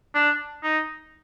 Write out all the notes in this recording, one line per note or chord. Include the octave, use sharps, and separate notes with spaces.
D4
D#4